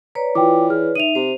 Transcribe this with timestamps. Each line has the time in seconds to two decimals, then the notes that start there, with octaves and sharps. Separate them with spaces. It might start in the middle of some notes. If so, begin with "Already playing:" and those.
0.15 B4 C#5 D5 A#5
0.35 E3 F4 G5 D6
0.70 G#4 F6
0.95 D#4 E5 D#7 F7
1.15 C3 C5